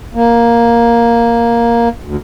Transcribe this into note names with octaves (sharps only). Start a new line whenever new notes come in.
A#3
D2